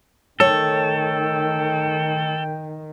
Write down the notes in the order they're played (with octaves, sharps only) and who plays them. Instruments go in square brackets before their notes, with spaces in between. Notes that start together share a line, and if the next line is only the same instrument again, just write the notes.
[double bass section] D#3 [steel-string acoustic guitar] A3 C#5 [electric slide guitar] A4 [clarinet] G5